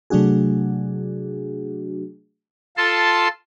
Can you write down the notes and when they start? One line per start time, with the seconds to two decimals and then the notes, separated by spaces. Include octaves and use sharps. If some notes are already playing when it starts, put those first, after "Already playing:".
0.10 C3 F#3 A3 D4 F#4 G#4
2.77 F4 A4 A5 C6